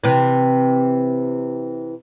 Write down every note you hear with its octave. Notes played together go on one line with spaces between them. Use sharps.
C3 E3